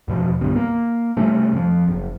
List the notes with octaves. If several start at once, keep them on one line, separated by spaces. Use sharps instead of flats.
E2 B2 F3
C2 G2 D3 B3
A#3
C3 G3 A3 C#4
F2 F3
F#1